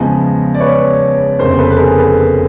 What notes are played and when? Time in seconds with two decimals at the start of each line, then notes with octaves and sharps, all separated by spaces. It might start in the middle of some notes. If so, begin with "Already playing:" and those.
Already playing: E2 C#3 F3 G#3
0.54 D5
0.60 B4 C#5
1.39 F1 E2 C#3 A#4 C5
1.58 A4 B4
1.70 B4
1.78 G#4 A#4
1.98 A4 B4